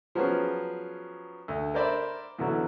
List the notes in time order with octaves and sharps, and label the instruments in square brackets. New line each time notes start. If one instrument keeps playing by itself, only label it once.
[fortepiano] F3 F#3 B3 C#4 G#4
D2
A#4 C5 D5 E5 B5
E2 B2 D3 F#3